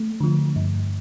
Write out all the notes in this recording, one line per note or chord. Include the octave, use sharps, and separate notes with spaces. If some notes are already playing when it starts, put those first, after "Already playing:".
Already playing: A3
D3 F3
G2